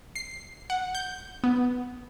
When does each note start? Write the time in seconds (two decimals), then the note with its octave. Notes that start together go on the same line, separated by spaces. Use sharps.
0.16 C7
0.70 F#5
0.95 G6
1.44 B3